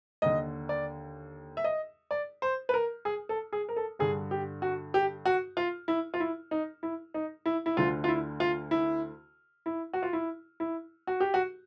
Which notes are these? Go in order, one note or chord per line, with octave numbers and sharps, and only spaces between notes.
D#2 D3 D#5
D5
E5
D#5
D5
C5
B4
A#4
G#4
A4
G#4
A#4
A4
G2 D3 G#4
G4
F#4
G4
F#4
F4
E4
F4
E4
D#4
E4
D#4
E4
E4
D2 D3 F4
F4
E4
F4
E4
E4
F#4
F4
E4
E4
F#4
G4
F#4